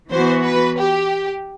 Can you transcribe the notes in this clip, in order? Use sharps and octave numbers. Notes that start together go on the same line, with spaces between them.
E3 B3 F#4 C5
B4
G4